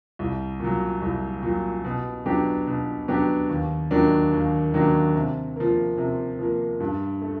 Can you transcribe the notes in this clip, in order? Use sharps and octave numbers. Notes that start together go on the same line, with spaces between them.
C2
A#2 F#3
C2
A#2 F#3
B2
F#3 B3 D4 G4
B2
F#3 B3 D4 G4
D#2
D#3 F#3 A#3 D4
D#2
D#3 F#3 A#3 D4
C3
F3 A#3
C3
F3 A#3
G2
A3